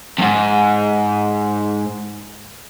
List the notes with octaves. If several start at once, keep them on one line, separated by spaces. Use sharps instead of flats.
F2 G#2